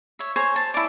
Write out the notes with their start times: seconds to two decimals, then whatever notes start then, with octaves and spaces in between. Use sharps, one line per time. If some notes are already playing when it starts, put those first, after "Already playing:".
0.19 C#5 E5
0.36 C5 C#5 G#5 A#5
0.56 A5
0.74 E4 D5